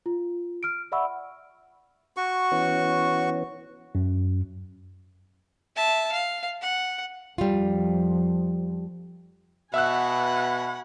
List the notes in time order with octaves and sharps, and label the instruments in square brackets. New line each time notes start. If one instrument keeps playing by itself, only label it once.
[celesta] F4
F6 D7
D5 E5 F#5 B5 C#6 E6
[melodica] F#4 C#6
[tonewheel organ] E3 B3 C#4
[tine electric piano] F#2
[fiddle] E5 A5
F5
F#5
[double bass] F2 F3 [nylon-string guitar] G3 F4
[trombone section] B2 [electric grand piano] E5 E6 F#6 [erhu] F#5 [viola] G#5 B5